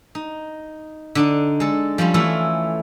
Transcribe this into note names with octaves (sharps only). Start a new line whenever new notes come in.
D#4
D3 D4 D#4
G#3 A4
F3 G3 C#4 F4
E3 A3 E4 F4